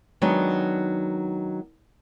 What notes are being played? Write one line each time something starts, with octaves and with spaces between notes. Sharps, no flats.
D#3 F#3 G#3 B3 D4 D#4